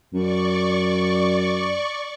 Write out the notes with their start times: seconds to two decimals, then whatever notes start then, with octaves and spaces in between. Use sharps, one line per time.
0.13 F#2 D5 C#6